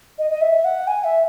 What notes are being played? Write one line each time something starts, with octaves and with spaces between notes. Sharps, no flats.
D#5
D#5
E5
F#5
G#5
E5